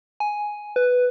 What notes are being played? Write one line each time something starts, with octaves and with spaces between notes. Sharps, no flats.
G#5
B4